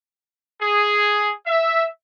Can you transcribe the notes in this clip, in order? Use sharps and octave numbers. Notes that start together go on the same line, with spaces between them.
G#4
E5